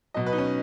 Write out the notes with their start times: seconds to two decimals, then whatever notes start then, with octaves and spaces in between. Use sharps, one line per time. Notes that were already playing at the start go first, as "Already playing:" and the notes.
0.14 B2 F#3 D#5
0.26 B4
0.33 D#4
0.38 C#4